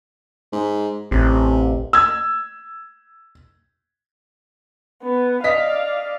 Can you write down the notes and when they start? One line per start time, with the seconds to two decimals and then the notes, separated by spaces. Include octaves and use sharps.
0.52 G#2
1.11 A1 C3
1.93 E6 G#6
5.03 B3
5.44 D5 D#5 F5 B6